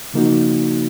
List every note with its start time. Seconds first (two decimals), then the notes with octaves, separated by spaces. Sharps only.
0.14 C#3 F3 A#3 D#4 F#4